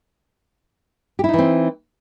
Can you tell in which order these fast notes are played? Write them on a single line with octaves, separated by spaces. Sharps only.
G4 E4 D#4 E3 C4